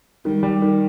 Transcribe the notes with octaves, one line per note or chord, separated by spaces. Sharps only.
D#3 G3
G3
D#3